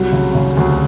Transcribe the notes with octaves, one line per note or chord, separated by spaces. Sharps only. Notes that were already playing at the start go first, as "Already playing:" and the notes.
Already playing: C2 F#3
C#3
C#3
D2